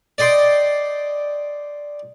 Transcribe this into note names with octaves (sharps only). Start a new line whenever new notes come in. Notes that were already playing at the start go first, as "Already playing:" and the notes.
D5 D#5 G5 C6